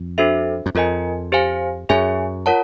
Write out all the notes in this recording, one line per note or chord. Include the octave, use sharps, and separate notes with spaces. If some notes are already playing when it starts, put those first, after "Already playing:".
Already playing: F2
D4 F#4 A4 C5 E5
F#2
F2 F4 A#4 D#5 G#5
G4 C5 F5 G#5
F#2 G#4 C#5 E5 G#5
F4 A#4 C#5 F#5 A5